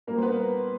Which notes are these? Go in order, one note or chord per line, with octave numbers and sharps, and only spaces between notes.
A#2 G3 A#3 A#4
C5
B3 B4